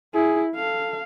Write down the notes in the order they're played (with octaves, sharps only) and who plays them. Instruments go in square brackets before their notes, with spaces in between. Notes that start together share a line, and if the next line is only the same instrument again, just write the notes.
[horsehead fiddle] E4 [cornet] G#4
[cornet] A4 [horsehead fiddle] F5